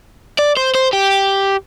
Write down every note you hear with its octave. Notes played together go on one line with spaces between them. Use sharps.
D5
C5
C5
G4